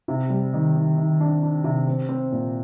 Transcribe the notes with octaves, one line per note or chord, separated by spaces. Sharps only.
C3
G3
D#3
D#3
D#3
D4
D4
C3
C4
C4
A#2